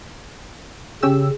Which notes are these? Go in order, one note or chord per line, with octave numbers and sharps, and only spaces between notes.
C#3 C#4 G4 E6